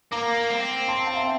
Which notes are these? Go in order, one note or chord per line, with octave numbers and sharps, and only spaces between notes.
A#3 A#5 D6
C4
A5 C6
F5 A5
E5 G5